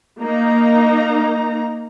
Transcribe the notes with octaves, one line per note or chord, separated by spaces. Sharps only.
A#3 D#4 A#5